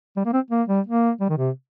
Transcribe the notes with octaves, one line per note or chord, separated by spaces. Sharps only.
G3
A#3
C4
A#3
G3
A#3
G3
D#3
C3